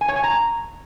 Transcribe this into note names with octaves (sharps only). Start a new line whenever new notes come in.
G#5
C#5
G#5
A#5